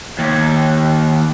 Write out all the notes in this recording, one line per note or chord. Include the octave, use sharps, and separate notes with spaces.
D#2